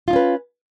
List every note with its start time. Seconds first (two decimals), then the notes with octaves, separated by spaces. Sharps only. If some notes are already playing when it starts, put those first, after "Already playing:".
0.08 F4
0.10 D#4
0.13 C#4
0.16 B4